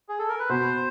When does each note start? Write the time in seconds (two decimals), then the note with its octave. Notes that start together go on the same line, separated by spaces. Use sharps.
0.08 G#4
0.19 A4
0.29 A#4
0.39 B4
0.49 B2 C5